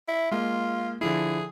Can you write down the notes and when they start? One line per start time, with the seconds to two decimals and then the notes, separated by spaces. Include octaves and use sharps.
0.08 E4
0.31 G#3 A#3 F4
1.01 D3 F3 E4 G#4